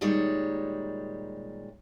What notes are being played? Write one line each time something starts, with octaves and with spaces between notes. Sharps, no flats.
A#2 D#3 G3 G#3 C#5